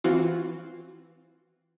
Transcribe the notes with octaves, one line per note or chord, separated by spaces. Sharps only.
E3 C4 F4 F#4